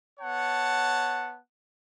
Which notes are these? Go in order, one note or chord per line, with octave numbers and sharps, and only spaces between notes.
B3 C#5 F#5 A5